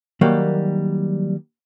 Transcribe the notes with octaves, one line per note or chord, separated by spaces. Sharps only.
D#3 F#3 G3 A#3